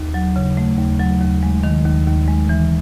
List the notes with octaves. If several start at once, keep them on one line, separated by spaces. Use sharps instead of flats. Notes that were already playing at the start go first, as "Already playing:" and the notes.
Already playing: D#2
F#3
C#3
A3
D#2
F#3
D#2
G#3
D#3
D#2
D#2
G#3
E3